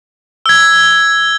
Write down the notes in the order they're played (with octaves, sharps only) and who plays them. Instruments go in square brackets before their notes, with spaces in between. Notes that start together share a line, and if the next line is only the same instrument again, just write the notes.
[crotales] E6 G#6